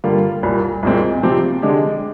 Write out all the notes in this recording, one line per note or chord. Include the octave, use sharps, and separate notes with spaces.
G2 D3 G3 A#3 F4
C2 A#2 G3
C2 A#2 G#3 C4
C3 F3 C4 G4
D3 G#3 D4 G4